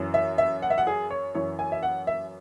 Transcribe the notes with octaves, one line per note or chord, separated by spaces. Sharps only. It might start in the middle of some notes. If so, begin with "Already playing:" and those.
Already playing: F#2 E3
E5
E5
F#5
E5
F#5
G#4
C#5
F#2 E3 C#5
G#5
E5
F#5
E5